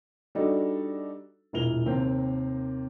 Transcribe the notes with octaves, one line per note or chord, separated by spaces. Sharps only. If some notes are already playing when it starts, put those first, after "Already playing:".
G3 D4 D#4 F#4 A4
E1 A#2 E4 A#4 F7 G7
D#2 C3 A#3 C4